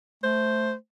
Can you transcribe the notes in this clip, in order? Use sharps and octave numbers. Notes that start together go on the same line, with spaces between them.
A3 C5